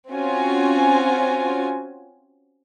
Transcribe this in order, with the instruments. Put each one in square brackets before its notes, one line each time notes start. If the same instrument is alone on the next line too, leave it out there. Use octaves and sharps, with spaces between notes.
[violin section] C4 C#4 F4 F#4 G#5